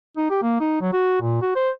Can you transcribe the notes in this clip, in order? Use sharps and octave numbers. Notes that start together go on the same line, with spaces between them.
D#4
G4
A#3
D#4
F#3
F#4
A#2
F#4
C5